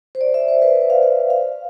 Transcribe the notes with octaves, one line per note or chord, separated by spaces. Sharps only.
C5
D5
E5
C5
B4
B4
F5
F5
F5